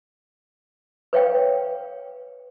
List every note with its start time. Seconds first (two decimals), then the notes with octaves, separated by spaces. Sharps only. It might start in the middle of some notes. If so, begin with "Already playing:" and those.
1.13 B4 C#5 F5 G5